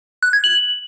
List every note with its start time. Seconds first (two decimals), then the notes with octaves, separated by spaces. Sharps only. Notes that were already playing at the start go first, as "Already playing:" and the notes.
0.23 F#6
0.33 G#6
0.44 F#7